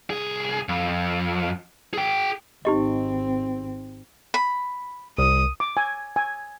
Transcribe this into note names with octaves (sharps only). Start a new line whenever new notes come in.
C2 G#4
F2
G#4 G5
G#1 C4 D#4 G4 D#5
B5
C2 D#6
D6
G#5
G#5